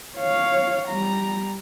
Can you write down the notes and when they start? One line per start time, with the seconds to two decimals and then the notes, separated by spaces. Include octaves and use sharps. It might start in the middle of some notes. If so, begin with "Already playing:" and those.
0.18 C#5 F5
0.89 G3 A#5